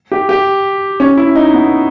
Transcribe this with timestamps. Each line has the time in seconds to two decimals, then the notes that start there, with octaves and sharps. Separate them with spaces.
0.12 G4
0.29 G4
1.00 C#4
1.17 E4
1.36 D#4
1.53 B3